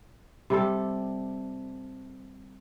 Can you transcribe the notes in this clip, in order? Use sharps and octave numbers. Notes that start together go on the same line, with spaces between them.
C3 G3 A4